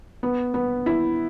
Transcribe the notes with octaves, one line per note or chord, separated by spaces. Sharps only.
B3
B3
E4